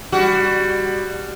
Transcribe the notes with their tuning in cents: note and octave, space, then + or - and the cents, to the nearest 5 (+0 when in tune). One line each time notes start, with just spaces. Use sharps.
G3 +20 F#4 +20